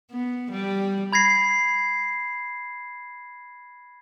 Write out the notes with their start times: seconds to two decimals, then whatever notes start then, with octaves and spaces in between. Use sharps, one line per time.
0.12 B3
0.51 G3
1.13 B5 G#6 A#6 C7